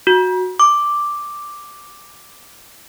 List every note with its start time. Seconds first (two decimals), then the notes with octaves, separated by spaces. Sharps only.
0.07 F#4
0.60 D6